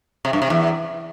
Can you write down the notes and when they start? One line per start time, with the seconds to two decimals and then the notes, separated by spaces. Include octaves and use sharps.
0.25 C3
0.33 G2
0.42 C3
0.50 E2